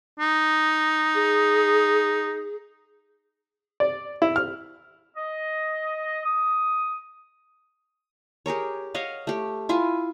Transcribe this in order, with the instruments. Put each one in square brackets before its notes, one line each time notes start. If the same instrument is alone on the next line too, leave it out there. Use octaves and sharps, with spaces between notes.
[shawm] D#4
[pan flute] G#4
[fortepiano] D5
E4
F6
[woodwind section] D#5
D#6
[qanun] G4 G#4 A#4 C#5
C#5 D#5 F5 F#5
A3 G4
E4 F4 G#5